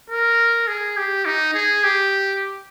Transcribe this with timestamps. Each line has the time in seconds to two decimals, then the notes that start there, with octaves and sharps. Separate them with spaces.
0.10 A#4
0.67 G#4
0.97 G4
1.25 D#4
1.54 G#4
1.84 G4